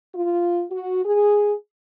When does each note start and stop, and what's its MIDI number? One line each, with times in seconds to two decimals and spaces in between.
0.13 0.64 65
0.70 1.04 66
1.04 1.54 68